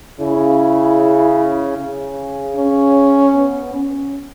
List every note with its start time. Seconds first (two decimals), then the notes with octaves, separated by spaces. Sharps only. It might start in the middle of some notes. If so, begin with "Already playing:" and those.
0.20 C#3 E4
1.78 C#3
2.56 C#4
3.34 B3
3.74 C#4